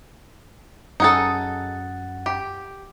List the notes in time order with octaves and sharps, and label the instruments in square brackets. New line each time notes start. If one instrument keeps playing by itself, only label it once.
[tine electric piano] F#2 F#5 A6 [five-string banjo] D#4 G#4 A4
[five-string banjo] G4